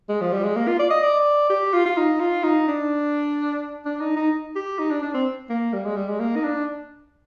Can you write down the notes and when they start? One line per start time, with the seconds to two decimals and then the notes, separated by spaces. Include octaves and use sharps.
0.09 G#3
0.21 F3
0.32 G3
0.44 G#3
0.56 A#3
0.68 F4
0.79 D5
0.91 D#5
1.03 D5
1.50 G4
1.74 F4
1.86 F4
1.98 D#4
2.21 F4
2.44 D#4
2.68 D4
3.86 D4
4.01 D#4
4.16 D#4
4.56 G4
4.79 D#4
4.91 D4
5.03 D4
5.14 C4
5.50 A#3
5.73 G3
5.85 G#3
5.96 G3
6.09 G#3
6.20 A#3
6.36 D#4
6.44 D4